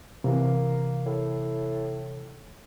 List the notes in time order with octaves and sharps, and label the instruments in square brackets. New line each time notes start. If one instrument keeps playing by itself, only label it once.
[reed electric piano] C3 E3 [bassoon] A#3
[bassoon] A2